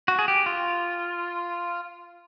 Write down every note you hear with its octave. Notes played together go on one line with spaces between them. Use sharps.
F#4
G#4
G4
F4